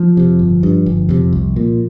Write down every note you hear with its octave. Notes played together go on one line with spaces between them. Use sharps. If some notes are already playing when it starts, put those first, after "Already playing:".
Already playing: F3
F2 C3
G1
G2
G1
F2 C3
C2
A#2